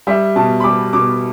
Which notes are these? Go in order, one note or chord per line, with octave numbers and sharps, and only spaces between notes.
G3 E5
B2 A5
B5
G3 D6
B2 D6